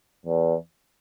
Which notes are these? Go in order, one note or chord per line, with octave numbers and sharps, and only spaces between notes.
E2